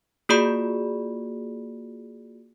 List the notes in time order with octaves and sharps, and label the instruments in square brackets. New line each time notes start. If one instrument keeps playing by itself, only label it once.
[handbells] A#3 F4 F#4 G#4 D5 B5